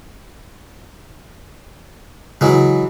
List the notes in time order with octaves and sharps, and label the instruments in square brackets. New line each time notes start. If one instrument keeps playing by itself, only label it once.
[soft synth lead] C#3 [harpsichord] E3 F#3 G#3